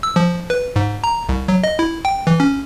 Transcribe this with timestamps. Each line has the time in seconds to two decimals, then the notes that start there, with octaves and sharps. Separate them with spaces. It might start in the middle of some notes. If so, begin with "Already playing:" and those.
0.03 E6
0.16 F3
0.50 B4
0.76 G#2
1.04 A#5
1.29 C2
1.48 F#3
1.64 D#5
1.79 E4
2.05 G5
2.27 E3
2.40 C#4